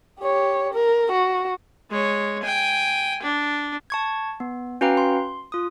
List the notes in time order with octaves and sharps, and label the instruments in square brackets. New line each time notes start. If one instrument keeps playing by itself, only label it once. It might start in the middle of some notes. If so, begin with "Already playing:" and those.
[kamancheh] G4 C#5
A#4
F#4
[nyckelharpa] G#3 C#5
G5 G#5
D4
[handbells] A5 C#6 G#6
B3
C#4 F#4 B4 F5 G5 A#5
C6
F4 D#6